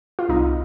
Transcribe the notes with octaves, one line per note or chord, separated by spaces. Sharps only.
F4
C2 D#4